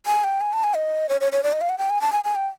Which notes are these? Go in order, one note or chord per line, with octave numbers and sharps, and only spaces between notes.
G#5
G5
G#5
A5
G#5
D#5
C#5
C#5
C#5
D5
D#5
F5
F#5
G5
G#5
A5
G#5
G#5
G5